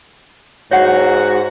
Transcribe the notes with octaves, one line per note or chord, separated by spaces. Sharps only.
G#2 F#4 C#5 F#5